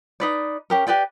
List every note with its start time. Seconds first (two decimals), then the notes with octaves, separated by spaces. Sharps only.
0.20 D#4 B4 D5
0.70 C#4 G4 A#4
0.87 G4 B4 D5 G5